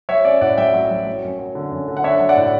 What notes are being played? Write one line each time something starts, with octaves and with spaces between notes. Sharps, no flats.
F#3 C#5 E5
C#4 D5
A2 D5 F#5
F#3 E5 G5
F#3
F#3
F#3
F#2
F#3
D3
F#2
D3
F#5
D4 C#5 E5
F#3
D5 F#5
A2